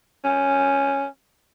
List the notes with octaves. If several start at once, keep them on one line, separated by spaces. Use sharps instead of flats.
C#4